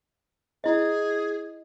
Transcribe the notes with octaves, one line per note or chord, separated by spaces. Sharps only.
E4 G#4 D#5